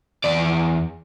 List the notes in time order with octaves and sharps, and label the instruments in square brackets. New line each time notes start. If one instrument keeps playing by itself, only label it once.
[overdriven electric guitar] E2 D5